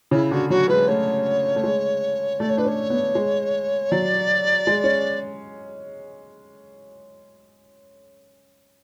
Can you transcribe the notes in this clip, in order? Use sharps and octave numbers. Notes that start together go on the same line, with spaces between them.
C#3 E4
D3 F#4
F#3 F#4
G#3 B4
A3 C#5
A3
G#3
A3 D5
C#5
D4 B4
C#4 C#5
B3
G#3
F#3 D5
G#3
C#4